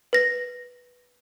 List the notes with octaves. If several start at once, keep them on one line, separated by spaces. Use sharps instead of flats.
B4 A#6